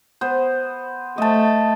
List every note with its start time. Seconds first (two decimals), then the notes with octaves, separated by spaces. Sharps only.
0.21 B3 C5
1.18 A3 D#5 A5